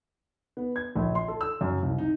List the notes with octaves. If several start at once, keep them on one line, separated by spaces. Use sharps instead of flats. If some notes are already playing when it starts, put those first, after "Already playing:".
B3
G#6
A#1
C6
A4
E6
F#2
C2
D#4